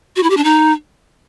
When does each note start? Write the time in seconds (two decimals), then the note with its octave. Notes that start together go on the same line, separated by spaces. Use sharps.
0.16 F#4
0.23 E4
0.30 G4
0.37 D4
0.44 D#4